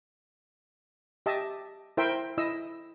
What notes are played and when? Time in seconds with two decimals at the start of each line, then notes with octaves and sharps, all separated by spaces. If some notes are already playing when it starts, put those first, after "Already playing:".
1.26 G4 D#5 E5 A5
1.97 E4 A#4 C5 E5 G5
2.38 E4 D#5 E6